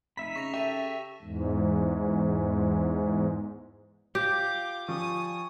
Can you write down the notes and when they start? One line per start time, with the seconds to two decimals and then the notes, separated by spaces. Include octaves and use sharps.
0.17 F1 D#4 E5 B5 B6
0.36 C#3 C#6 A#6 F7
0.54 G4 A4 E5 C#6 D#7 F7
1.22 E2 G#2
4.15 F4 G4 D6
4.88 F3 G3 G#5 C#6 D#6